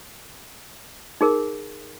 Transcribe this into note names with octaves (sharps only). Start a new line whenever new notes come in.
D#4 G#4 A#4